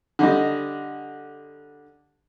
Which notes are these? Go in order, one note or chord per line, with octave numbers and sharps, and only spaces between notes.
D3 G3 D#5